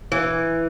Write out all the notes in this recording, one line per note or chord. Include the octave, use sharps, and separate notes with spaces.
E3